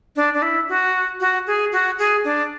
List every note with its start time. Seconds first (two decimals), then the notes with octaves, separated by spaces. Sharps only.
0.16 D4
0.34 D4
0.42 E4
0.69 F#4
1.20 F#4
1.47 G#4
1.72 F#4
1.99 G#4
2.24 D4